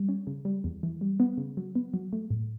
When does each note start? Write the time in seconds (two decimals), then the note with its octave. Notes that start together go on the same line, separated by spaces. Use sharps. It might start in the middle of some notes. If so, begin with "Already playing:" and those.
Already playing: G3
0.09 C#4
0.27 C#3
0.45 G3
0.64 E2
0.83 E3
1.01 G3
1.20 B3
1.38 C#3
1.57 F#3
1.75 B3
1.94 F#3
2.13 A3
2.30 A2